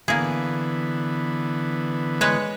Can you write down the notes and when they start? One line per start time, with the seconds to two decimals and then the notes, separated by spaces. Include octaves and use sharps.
0.08 D3 E3 A#3 B3 G#4
2.21 G#3 B4 C#5